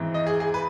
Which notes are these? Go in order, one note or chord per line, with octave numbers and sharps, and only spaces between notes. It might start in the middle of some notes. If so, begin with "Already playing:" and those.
Already playing: G#1 G#2 E3
D#5
G#4
G#4
B4